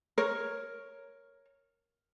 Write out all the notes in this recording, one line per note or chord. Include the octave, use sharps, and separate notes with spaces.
A#4 C#5